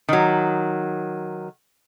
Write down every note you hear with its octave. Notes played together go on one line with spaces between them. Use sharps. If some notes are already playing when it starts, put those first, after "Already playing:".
D#3 F#3